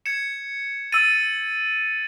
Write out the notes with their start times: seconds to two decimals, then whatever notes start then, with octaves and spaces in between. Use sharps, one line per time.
0.06 G#6 C#7 E7
0.92 E6 A6 D#7